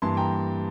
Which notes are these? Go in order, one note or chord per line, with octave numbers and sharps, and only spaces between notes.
G2 E3 A#3 A5 C6
G5 A#5